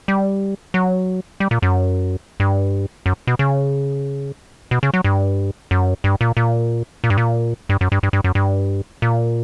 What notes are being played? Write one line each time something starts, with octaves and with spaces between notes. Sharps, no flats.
G3
F#3
G3
A#2
F#2
G2
F#2
B2
C#3
B2
C#3
F#3
G2
F#2
G2
A#2
A#2
A#2
G2
A#2
G2
F#2
G2
G2
G2
F#2
G2
A#2